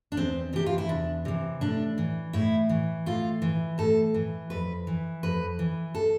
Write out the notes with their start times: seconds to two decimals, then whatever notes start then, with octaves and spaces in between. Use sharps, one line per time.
0.12 D4
0.17 E2 C4
0.53 C3 E3 G4
0.66 F4
0.78 E4
0.89 E2 D4
1.25 C3 E3
1.61 A2 D4
1.98 E3
2.33 A2 E4
2.69 E3
3.06 A2 F4
3.42 E3
3.78 A2 A4
4.14 E3
4.50 F2 B4
4.87 E3
5.23 F2 B4
5.59 E3
5.95 A4